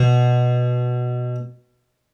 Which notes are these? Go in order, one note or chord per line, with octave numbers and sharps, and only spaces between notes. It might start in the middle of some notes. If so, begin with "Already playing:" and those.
Already playing: B2